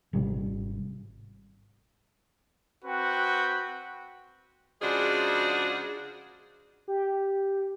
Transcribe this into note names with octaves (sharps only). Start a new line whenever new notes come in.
G#1 C3 G3
C4 F#4 B4 G5
C#3 F3 G#3 D4 F#4 G#4
G4